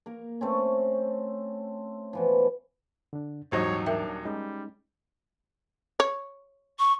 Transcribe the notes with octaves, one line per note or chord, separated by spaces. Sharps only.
A#3 A#4
A3 C4 C#4
B2 E3 F3
D3 D4
D#1 G#2 E3 F#3 D#4 C5 C#5
D4 A#4 E5 G5
G3 G#3 C#4 D#4
C#5
C#6